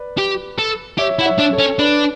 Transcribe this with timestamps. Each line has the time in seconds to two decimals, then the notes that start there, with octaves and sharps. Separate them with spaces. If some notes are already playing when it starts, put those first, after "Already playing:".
Already playing: B4 D5
0.18 G4
0.59 A4
0.98 G4 C#5 E5
1.19 E4 F#5
1.25 C#5 E5
1.39 D4
1.52 A4 C#5
1.58 C#4
1.79 D4 B4 D5